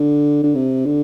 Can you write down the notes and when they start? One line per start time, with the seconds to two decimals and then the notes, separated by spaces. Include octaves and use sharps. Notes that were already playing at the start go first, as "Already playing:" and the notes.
Already playing: D3
0.43 D3
0.55 C3
0.85 D3